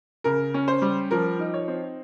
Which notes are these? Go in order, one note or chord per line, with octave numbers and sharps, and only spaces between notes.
C#3 A#4
C#4
C5
G3
F3 A#4
D#4
C#5
C4